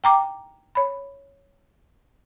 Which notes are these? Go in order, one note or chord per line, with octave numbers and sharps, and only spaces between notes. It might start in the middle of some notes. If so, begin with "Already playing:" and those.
G5 A#5 D6
C#5 B5